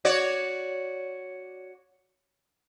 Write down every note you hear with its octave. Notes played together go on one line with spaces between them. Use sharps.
F#4 C#5 D5